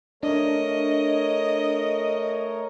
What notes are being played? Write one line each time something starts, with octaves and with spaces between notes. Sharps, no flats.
A3 D4 A#4 C#5 D#5